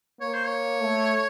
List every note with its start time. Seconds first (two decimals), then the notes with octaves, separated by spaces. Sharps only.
0.21 A#3 C#5
0.34 C5
0.46 C#5
0.81 A3